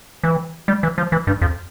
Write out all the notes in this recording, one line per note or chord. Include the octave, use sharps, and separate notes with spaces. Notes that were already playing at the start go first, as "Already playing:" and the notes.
E3
G3
E3
F3
E3
G2
F2